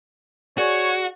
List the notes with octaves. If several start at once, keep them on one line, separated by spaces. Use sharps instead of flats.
F#4 G#4 C#5 D5